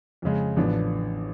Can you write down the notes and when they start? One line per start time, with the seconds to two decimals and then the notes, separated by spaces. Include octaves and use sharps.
0.22 F2 C#3 G#3
0.56 A1 A2 F3 B3 D4